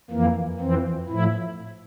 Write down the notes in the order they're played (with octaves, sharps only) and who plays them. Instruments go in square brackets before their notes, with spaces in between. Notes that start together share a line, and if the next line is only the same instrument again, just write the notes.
[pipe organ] F2 E3 A#3
F2 E3 C4
A2 F3 E4